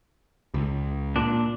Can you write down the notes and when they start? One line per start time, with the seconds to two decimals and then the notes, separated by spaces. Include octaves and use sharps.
0.54 C#2
1.16 A#2 D4